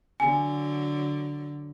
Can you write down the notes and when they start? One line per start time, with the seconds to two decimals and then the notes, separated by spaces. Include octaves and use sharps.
0.20 D3 F#3 G#5